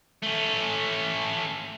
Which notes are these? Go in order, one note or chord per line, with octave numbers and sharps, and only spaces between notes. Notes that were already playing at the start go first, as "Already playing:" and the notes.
A3 C#4